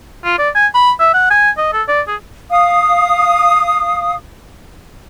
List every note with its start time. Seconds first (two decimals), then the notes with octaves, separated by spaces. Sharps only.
0.25 F4
0.38 D5
0.55 G#5
0.75 B5
1.00 E5
1.14 F#5
1.31 G#5
1.58 D#5
1.73 A4
1.89 D5
2.08 G#4
2.50 F5 D#6